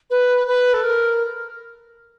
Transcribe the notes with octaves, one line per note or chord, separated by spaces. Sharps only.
B4
B4
A4
A#4